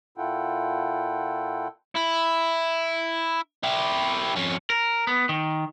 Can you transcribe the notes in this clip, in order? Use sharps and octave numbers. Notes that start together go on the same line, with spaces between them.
A#2 E4 F4 A4 F#5 G5
E4
E4 G4
F2 C#4
A#4
B3
D#3